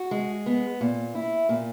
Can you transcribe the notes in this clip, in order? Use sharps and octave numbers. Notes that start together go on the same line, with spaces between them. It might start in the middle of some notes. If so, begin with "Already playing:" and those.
Already playing: F#4
G#3
B3
A#2
E4
A#2